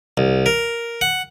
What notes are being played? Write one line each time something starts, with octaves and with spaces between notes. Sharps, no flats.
C2
A#4
F#5